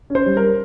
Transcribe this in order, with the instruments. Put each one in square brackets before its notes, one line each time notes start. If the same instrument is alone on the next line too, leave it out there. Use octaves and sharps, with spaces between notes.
[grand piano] C#4
C5
G3
A#4